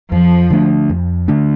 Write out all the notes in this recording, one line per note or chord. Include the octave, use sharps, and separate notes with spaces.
F2 F3
D3 A3 D4
F2
D3 A3 D4